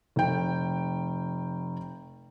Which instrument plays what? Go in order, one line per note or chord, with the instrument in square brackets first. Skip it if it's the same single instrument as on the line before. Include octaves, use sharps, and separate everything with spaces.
[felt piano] F1 G5